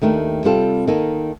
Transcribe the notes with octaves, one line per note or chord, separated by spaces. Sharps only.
D#2 D#3 A3 D4
C3 G3 C4 F4 A4
D#3 A#3 D#4 A4